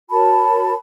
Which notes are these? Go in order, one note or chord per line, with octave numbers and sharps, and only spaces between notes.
F#4 A#4 C#5 A5 B5